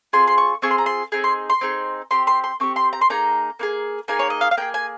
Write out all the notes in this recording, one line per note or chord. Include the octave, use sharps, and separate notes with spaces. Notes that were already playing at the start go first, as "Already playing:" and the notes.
C4 F4 G#4 C6
C6
C#6
C4 F4 G#4 C#6
C6
A#5
C6
C4 D#4 G#4
C6
C6
C4 D#4 G#4
C4 G4 C6
C6
C6
C4 G4 C#6
C6
A#5
C6
A#3 D#4 G#4 A#5
A#3 D#4 G#4
A#3 D#4 G#4 G#5
C#5
D#5
F5
F5
A#3 D#4 G#4 G5
G#5